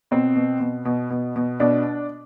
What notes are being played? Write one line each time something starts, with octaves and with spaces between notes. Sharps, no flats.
B2 C4
B2
B2
B2
B2
B2
B2 D4